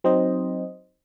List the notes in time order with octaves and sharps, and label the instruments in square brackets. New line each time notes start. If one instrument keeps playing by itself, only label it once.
[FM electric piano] F#3 C4 D#4 C5 D#5